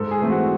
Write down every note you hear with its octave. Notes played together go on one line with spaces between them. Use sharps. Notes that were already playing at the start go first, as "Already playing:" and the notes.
Already playing: G#2 A4
G#4
E3 A3 C4
F#4